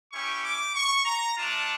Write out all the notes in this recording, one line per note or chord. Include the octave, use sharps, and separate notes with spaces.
C#4 E4 G4 C#6
D6
C#6
A#5
A3 D4 F4 A5